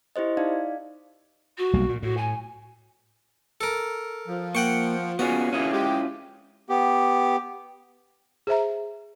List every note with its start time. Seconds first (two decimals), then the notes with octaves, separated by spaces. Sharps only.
0.16 E4 G4 C5 D#5
0.37 D#4 D5 F5
1.57 F#4
1.73 B1 G3 A#3
1.89 A#2
2.03 A2 F#4
2.17 G#5
3.61 A4 A#4
4.27 F3
4.55 A#3 F#5 G5 C#6
5.19 B3 C#4 F4 F#4 G#4
5.53 A#3 C#4 E4 F4 G#4
5.72 G#3 G4
6.69 B3 G4
8.47 G#4 C5 E5 A#5